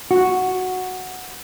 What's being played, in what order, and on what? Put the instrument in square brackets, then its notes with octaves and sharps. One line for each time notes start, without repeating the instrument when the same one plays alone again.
[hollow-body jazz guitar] F#4